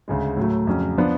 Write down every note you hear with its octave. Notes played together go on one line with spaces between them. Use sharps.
D2 C#3 G#3
A2 F#3 A3
F2 C#3 F#3 C#4
F3 B3 D4